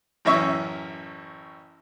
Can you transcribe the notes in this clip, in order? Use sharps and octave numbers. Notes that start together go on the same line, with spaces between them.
A1 F#2 C#4 E5 C#6